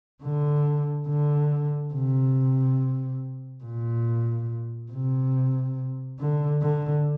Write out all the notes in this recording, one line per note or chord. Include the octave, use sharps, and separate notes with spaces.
D3
D3
C3
A#2
C3
D3
D3